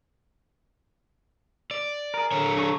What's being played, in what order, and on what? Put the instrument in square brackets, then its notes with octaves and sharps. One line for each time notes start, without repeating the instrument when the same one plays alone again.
[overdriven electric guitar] D5
[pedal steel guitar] G#4 A#4
[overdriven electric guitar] D3 C#5
[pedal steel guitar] D4 D#4 C#6